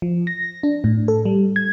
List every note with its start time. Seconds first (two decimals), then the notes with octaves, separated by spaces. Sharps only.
0.02 F3
0.27 A#6
0.63 D4
0.84 A2
1.08 A4
1.25 G3
1.56 G#6